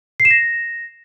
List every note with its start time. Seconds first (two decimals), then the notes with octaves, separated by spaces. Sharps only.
0.20 C7
0.25 E7
0.31 A#6